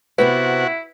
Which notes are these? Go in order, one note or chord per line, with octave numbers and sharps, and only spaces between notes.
C3 B3 C4 E4 F#4 B4